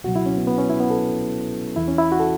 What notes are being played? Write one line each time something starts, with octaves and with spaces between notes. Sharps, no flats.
C#2 B2 F#3 F#4
E4
C#4
B3
B3
C#4
E4
B3
A4
E2 E3 E4
C#4
E4
F#4
A4